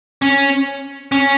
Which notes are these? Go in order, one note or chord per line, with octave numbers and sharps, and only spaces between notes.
C#4
C#4